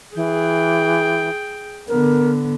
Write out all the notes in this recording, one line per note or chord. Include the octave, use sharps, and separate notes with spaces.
E3 G#4 G5
D3 B3 A#4